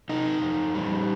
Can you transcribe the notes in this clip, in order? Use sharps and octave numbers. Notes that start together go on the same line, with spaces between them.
C3 D#4
F2
G3